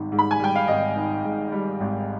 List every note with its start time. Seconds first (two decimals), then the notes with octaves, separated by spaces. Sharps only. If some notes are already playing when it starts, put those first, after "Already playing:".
Already playing: G#1 D#3 G3
0.12 G#2
0.19 B5
0.31 G#5
0.40 G3 G5
0.56 F5
0.68 G#1 D#5
0.96 D#3
1.24 G#2
1.52 G3
1.81 G#1